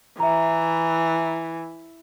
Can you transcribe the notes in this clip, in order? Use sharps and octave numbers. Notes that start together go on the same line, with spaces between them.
E3 E5 A#5